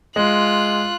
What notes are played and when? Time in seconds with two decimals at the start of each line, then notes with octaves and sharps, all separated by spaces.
0.16 G#3 F4 F#6